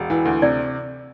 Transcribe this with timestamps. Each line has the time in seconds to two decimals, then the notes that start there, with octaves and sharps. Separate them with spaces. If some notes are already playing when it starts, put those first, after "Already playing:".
Already playing: E1
0.10 E3
0.25 D2
0.42 C3 D5